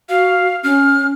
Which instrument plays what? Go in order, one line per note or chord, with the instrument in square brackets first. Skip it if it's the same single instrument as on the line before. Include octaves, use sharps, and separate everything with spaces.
[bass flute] F#4 [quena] F5
[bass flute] C#4 [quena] F6